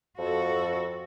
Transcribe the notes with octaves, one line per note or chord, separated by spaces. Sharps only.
F2 F#4 A4